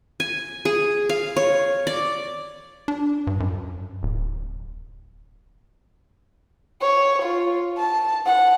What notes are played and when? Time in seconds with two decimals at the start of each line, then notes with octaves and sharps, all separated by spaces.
0.20 G#5
0.65 G#4
1.09 F5
1.37 C#5
1.87 D5
2.88 D4
3.27 G2
3.40 F#2
4.03 D1
6.81 C#5
7.22 F4
7.78 A5
8.26 F#5